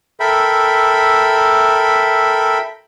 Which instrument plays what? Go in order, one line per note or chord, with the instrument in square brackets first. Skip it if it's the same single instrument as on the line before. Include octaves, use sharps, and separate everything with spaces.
[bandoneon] A4 A#4 E5 G5 B5